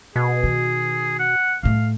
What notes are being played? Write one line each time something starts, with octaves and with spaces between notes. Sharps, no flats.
B2 G#4
D#3
F#5
A2 A3 F5